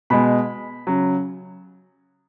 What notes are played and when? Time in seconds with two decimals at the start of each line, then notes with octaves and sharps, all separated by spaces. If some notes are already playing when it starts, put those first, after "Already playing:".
0.10 B2 G#3 B5
0.87 C#3 F#3